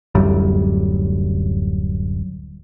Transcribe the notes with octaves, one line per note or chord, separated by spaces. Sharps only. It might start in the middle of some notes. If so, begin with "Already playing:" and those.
D1 F#2 G3